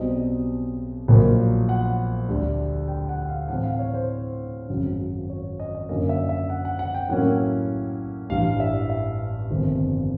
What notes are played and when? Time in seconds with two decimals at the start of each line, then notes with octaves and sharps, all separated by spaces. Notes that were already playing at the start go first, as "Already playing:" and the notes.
Already playing: B1 B2 G3 C4 D#4 D#5
1.08 A#1 A#2 F#3 A#3 D#4
1.69 F#5
2.29 D2 D3 G3
2.88 G5
3.09 F#5
3.28 F5
3.49 A2 E3 A3 C4 F#5
3.64 F5
3.79 C#5
3.94 C5
4.10 C5
4.69 G#1 F#2 C#3 F#3
5.30 C#5
5.60 D#5
5.75 D#5
5.89 F#2 D3 F#3 A#3 D#5
6.09 E5
6.29 E5
6.50 F#5
6.65 F#5
6.79 F#5
6.95 G5
7.09 A2 F#3 A#3 C#4 E4 F#5
8.30 A1 G2 E3 F5
8.60 E5
8.90 E5
9.50 G1 F2 C3 D#3